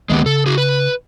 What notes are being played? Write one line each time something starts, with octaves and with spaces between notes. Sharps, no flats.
D2 D#3 G#3 A#3 B3 G4
C#3 A4
F#4 G#4
B4